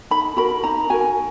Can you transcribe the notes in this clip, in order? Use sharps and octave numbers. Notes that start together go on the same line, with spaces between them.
D#4 B5
F#4 A#4 B5
D#4 A#5
F#4 A#4 G#5